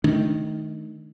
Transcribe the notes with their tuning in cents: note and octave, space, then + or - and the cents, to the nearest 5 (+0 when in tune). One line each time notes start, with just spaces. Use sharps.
D#3 +0 A3 -30 D4 +0